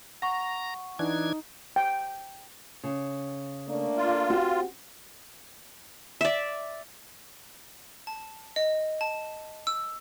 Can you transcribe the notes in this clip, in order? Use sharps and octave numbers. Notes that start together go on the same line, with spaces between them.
F#5 A#5 C#6
E3 D4 D#4 G#6
G5
C#3
A3 A#3 D4
F4
C4 F#4 G4
D5 E5
A5
D#5
A5
E6